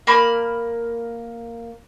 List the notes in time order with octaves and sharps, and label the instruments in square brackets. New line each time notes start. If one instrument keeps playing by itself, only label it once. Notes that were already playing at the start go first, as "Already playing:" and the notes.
[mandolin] A#3 B5 F6